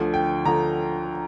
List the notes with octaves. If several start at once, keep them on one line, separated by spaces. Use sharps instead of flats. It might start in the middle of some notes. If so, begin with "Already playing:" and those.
Already playing: D2 D3 F3
G5
D3 F3 A#5